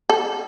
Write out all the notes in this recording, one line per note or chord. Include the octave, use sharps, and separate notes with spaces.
A4